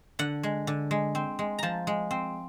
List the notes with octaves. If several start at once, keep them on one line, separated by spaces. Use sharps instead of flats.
D3 F#5
G#3
D3
G#3
C4
G#3
F3 A5 A#5
G#3
C4